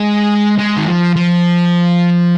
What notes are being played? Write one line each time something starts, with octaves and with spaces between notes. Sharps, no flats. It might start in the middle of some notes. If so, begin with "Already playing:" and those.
Already playing: G#3
G#3
D#3
F3
F3